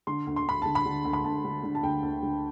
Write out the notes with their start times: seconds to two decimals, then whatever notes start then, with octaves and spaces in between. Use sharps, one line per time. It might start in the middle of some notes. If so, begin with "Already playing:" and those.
0.07 D3 C6
0.27 D2
0.36 C6
0.46 D2 B5
0.62 D3 A5
0.75 B5
0.86 D3
1.05 D2
1.13 B5
1.24 D2 A5
1.45 D3
1.63 D3
1.75 A5
1.83 D2 G5
2.03 D2
2.23 D3